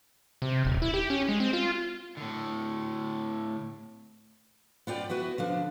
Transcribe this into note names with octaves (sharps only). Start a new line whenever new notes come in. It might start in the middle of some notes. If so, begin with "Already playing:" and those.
C3
D#1
E4
G4
C#4
G#3
C4
F4
A2 D3
B3 F4 D5 G5
B3 E4 F#4 B4
D3 F3 D4